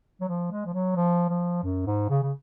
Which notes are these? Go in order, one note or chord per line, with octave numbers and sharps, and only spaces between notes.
F#3
F3
G#3
F3
F#3
F3
F3
F#2
G#2
C#3
C#3